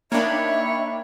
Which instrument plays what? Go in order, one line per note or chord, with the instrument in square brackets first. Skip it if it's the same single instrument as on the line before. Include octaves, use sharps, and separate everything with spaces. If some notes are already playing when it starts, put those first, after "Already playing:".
[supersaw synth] A#3 D4 [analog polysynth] D#4 G5 B5 [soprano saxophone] C#5 [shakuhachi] E5